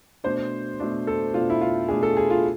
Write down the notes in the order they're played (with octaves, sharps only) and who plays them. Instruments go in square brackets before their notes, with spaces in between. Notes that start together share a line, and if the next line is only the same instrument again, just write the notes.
[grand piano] B2 A3 D4 C5
B2 A3 D4
A4
B2 A3 D4 F4
E4
F4
B2 A3 D4 G#4
A4
G#4
F4